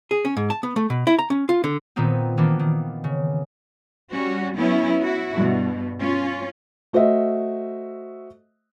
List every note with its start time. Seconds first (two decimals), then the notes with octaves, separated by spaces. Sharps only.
0.11 G#4
0.25 C#4
0.37 G#2
0.50 A5
0.63 B3
0.76 A3
0.90 B2
1.07 E4
1.19 A#5
1.30 C#4
1.49 F4
1.64 D3
1.96 A#2 D#3 B3 C4 D#4
2.37 D#3 E3 A#3 B3 D4
2.59 D#3
3.04 C#3
4.12 G3 C#4 F#4
4.56 F#3 B3 C#4 E4
5.01 E4 F#4
5.35 G2 B2
5.98 C#4 F4
6.93 A3 F#4 C5 D#5 E5